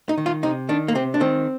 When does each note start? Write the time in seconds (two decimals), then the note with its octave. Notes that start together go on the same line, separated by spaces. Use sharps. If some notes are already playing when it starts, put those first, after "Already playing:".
0.09 D#4
0.18 D#3
0.26 F4
0.43 C3 D#4
0.69 D#3 D4
0.88 A#3
0.95 C3 C4
1.14 D4
1.20 D#3 C4